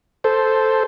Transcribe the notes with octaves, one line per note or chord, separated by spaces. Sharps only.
A4 C5